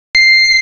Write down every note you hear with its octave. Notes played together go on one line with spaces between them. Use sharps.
C7